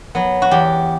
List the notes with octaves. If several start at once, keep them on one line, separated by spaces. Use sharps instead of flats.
F#3 B3
F#4
E2 G4